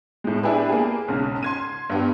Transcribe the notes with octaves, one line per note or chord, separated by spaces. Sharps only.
A2 G#3
D4 E4 G4 G#4 B4
A#3 G#4
B1 G#2 C#3
C6 G#6 D#7
G2 B3 G4